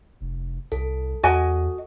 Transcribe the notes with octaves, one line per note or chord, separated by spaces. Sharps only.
F1
C2 A4
E2 F#4 D#5 G#5